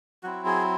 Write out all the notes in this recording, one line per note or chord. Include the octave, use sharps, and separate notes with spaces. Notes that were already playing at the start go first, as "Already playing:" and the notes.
F#3 C4 E4 F#4
G#4